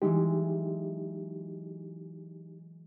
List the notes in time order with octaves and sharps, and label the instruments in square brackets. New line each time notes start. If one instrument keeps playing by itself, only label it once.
[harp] E3 F#3 G#3 [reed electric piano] D#4 G4